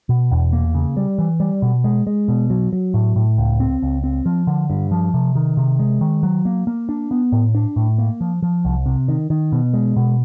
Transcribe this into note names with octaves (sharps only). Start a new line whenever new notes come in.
B2
E2
A#3
C#3
G3
E3
G3
B2
G#3
G#3
B2
F#3
F#3
A2
A2
C#2
C4
C#2
C4
F3
D3
G2
F3
C3
D#3
C3
G#3
D#3
F#3
A#3
A#3
D4
B3
A2
D4
A2
A#3
F3
F3
C2
C3
D#3
D#3
B2
G#3
B2